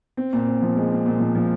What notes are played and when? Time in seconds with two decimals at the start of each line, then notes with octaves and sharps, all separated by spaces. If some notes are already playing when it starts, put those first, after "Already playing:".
0.17 C4
0.33 A#2
0.47 C4
0.62 F3
0.77 G#3
0.91 C4
1.06 A#2
1.20 F3
1.35 F3